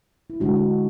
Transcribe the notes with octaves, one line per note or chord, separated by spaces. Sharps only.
E4
D3 G#3 D4 F#4
F#4